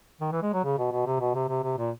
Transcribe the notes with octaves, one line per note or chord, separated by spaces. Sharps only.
D#3
E3
G#3
F#3
C#3
B2
B2
C3
B2
C3
C3
C3
A#2